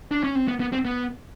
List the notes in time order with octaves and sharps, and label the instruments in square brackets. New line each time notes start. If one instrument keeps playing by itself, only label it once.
[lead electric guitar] D4
C#4
C4
B3
B3
C4
B3